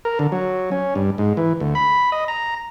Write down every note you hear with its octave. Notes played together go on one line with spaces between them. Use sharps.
A#4
D3
F#3
C#4
G2
G#2
E3
D2
B5
D#5
A#5